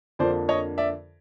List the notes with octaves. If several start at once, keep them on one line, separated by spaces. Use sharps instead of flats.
F2 D3 F3 A#3 D4 C5 D5
C#5 D#5
D5 E5